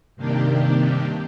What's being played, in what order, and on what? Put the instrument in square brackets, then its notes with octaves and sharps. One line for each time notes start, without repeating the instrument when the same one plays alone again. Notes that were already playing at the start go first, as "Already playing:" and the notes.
[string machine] G2 C3 D#3 A#3 D4 G4